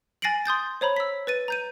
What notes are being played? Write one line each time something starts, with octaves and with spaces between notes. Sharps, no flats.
G#5 A6 A#6 C7 D7 F#7
C6 D#6 G6 A6
C5 C#5 A#5 B5
E6 B6
B4 A6 D#7
A#5 G6 D#7